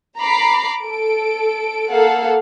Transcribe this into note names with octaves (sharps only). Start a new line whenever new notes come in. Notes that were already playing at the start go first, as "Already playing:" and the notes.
A#5 B5 D6 C7
A4 D7
A#3 A4 F5 F#5